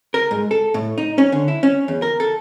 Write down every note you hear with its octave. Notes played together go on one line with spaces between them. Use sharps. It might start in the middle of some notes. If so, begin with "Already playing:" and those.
A#4
G#2
A4
A2
D#4
C#4
D3
E4
C#4
E2
A#4
A4